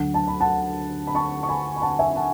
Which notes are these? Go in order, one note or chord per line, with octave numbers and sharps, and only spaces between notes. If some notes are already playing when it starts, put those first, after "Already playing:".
Already playing: D2 D3 F#3 F#5
A5
B5
F#5 A5
B5
A5 C#6
C#6
G#5 B5
B5
F#5 A5
E5 G#5
F#5 A5